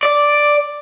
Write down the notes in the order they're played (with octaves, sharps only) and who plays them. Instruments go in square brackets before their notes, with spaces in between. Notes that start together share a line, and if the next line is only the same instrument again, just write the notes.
[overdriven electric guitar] D5